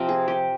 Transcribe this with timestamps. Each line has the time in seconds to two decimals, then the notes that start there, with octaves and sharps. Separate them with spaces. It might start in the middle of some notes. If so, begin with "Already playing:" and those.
Already playing: C3 F3 C4 A#4
0.09 G#4
0.28 G4